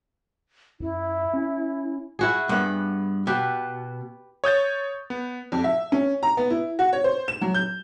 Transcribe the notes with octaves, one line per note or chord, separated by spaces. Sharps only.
F#2 E4
C#4
E4 F#4 G#4
G2 B3
B2 G4 B4
C#5 D#6 G6 A6
B3
F2
E5
C#4
A#5
B3
E4
F#4
C#5
C5
E7
F#3
G6